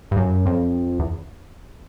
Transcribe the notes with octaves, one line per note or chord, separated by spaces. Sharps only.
G2
F#2
F2
E2